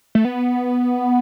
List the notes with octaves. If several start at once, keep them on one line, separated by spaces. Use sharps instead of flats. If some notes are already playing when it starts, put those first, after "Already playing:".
A3
B3